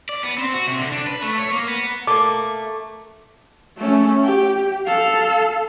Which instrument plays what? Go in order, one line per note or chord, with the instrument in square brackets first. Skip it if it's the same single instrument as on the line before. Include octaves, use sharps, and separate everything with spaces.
[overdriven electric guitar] D5
B3
C4
F#4
C3
D3
D4
B4
A3
C#5
A#3
B3
[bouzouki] A3 A#3 [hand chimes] D6
[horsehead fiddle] A3 C#4
G4
A4 F5